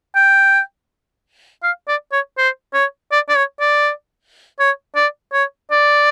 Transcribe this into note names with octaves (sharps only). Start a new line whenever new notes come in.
G5
F5
D5
C#5
C5
C#5
D5
D5
C#5
D5
C#5
D5
C#5
D5